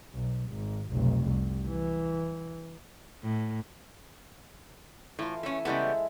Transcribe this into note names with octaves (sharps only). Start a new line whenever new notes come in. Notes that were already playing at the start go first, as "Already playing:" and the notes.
B1
G#1
F1 B1
C2
E3
A2
A2 E3 F4
A3 C#4 E5 G#5
C#3 G3 G#3 B3 E4 A4